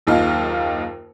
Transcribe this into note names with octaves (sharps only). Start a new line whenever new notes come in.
F#1 D#2 D#4 F4